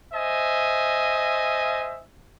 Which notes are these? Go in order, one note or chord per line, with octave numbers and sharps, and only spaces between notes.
C5 D#5 E5 G#5